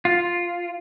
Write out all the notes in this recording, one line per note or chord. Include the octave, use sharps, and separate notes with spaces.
F4